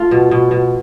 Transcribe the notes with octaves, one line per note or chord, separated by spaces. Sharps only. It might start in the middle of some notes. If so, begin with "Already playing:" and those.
Already playing: A3 F4
B2
B2
B2